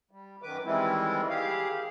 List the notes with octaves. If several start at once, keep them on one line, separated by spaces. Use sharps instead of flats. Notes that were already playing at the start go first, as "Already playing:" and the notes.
G3
F#2 D#3 B4 D6
D#3 E3 G3 G#3 C4 E4
G4 G#4 F5